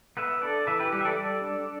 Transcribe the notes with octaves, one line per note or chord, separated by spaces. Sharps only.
B3 B4 E5
D4 A4 D5
E3 B4 E5
G4 B4
G3 G4 B4
E5
A4 D5
G3
D4